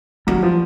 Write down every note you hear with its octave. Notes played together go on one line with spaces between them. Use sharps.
F#3 G3
F3